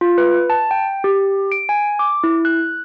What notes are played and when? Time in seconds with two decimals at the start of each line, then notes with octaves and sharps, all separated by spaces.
0.01 F4
0.18 B4
0.50 A5
0.71 G5
1.04 G4
1.52 D7
1.69 G#5
1.99 D6
2.24 E4
2.45 F#6